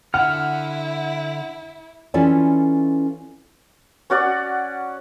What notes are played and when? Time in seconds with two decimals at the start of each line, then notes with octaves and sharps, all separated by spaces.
0.14 D3 E4 F#5 F6
2.14 E3 C#4 E4 F4 A4 D5
4.10 C#4 F#4 D5 F#5